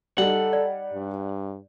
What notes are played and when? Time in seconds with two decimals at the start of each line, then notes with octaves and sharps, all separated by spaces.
0.18 G3 D#4 A4 F#5
0.53 D5
0.94 G2